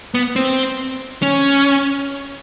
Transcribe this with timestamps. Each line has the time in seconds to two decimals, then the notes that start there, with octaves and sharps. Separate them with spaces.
0.14 B3
0.36 C4
1.22 C#4